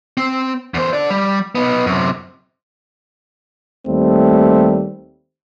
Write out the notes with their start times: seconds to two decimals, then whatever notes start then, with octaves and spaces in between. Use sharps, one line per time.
0.17 C4
0.74 E2 C5
0.93 D3 D5
1.10 G3
1.55 B3 D#4
1.86 F#2 C3
3.88 D#2 G3 A3 C4